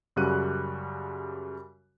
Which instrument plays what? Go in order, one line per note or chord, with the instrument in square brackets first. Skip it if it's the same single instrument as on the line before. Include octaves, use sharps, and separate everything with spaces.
[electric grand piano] F#2 C#3 G3 F#4 F#6 D#7